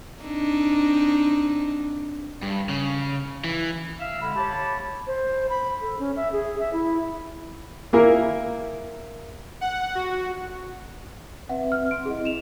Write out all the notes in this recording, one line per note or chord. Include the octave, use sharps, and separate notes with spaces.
C4 D4 D#4
G2
C#3
E3
E5 F5 E6
D3 G#3 B5
G4 C#5 A5
C5
B5
A4
C#4
E5
G#4
E5
E4
A#3 E4 G#4 A#4
F#5
F#4
C4 B4 E5 F#5
F6
F#5 C6 D7
C4 E4 G#4 D#5
E7 F7